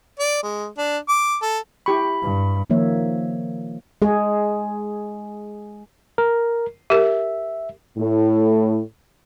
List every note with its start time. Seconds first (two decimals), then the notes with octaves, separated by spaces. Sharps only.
0.19 D5
0.43 G#3
0.78 D4
1.09 D6
1.42 A4
1.86 E4 G4 B5 C#6
2.22 G2
2.70 D#3 F3 A#3 C#5 E5
4.02 G#3 G#4
6.18 A#4
6.90 G4 A#4 E5
7.97 A2